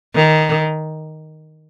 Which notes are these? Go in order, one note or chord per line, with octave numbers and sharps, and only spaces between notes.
D#3